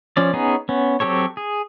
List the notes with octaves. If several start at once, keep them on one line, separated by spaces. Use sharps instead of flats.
F3 C#4 D5
B3 C#4 D#4 G#4
B3 C#4
F#3 C4 G4 A4 C#5
G#4